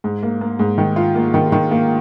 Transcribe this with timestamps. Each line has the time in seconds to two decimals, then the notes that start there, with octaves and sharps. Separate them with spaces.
0.04 G#2
0.23 A#3
0.41 A#3
0.59 G#2
0.78 D#3
0.96 F4
1.15 A#3
1.34 D#3
1.52 D#3
1.71 A#3